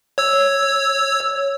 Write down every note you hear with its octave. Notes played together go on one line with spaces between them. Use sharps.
C#5 E6